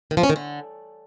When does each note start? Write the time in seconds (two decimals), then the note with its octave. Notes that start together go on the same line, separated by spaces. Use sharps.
0.11 D#3
0.17 F3
0.23 C#4
0.30 D#3
0.36 D3